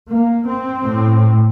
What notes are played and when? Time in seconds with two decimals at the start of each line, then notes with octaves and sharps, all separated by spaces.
0.08 A#3
0.47 C4
0.85 A2